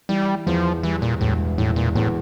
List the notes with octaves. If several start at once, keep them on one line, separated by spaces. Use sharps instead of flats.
E3 G3
E2 F3
E3 G3
A#2
E1 A2
A2 E3
A#2
E2 A2